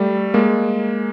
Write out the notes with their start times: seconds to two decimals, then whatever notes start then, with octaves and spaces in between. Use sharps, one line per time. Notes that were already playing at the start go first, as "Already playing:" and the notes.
Already playing: G3 A3
0.34 G#3 A#3